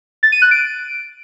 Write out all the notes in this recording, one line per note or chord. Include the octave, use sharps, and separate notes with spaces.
A6
D#7
F#6
D7